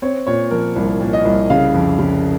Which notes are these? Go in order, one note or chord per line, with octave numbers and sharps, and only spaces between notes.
C4 C#5
A#2 C#5
F3 A#4
C2
A#2
D#5
C2
C#3 F5
F2
C#3